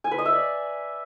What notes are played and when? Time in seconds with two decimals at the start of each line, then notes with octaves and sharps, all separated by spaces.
0.04 G#5
0.11 B4
0.18 D#5
0.25 E5
0.33 D5